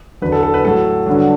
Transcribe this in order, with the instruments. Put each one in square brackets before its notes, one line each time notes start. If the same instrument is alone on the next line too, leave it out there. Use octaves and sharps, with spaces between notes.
[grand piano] E2 D3 F#3 B4
A4
A4
B4
A2 F#3 A4
G2 D3 F#3